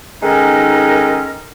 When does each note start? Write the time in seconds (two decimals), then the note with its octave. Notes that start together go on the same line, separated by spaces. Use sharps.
0.22 D#3 G#3 C#4 D#4 A4 A#4